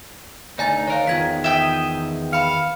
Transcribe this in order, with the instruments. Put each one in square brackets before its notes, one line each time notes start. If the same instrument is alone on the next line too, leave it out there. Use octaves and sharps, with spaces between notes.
[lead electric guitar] D2 D#4 [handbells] D5 G#5 A6
[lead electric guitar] D#3 A#4 [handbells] C#5 F5
[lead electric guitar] E2 D#3 [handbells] F4 G#6 B6
[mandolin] E5 G5 D#6
[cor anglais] F5 [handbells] B5 C#7